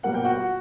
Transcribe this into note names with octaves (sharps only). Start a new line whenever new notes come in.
B2 G3 A#3 F#5
G5
F#4 F#5